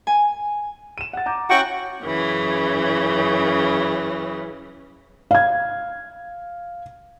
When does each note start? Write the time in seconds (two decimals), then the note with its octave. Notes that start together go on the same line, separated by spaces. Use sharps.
0.07 G#5
0.98 D#7 E7
1.13 F#5 A6
1.26 A#5 D6 G6
1.50 C#4 E4 F#4 F#5 G5 C#6
2.03 F#2 C#3 E3
5.31 F5 G#6